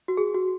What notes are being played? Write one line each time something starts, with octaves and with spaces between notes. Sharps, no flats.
F#4
G#4
F#4